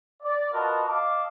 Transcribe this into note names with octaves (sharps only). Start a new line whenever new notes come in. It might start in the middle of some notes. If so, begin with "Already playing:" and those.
D5
F4 F#4 A#4 B4 D#5 A5
D#5 F5 A5 D6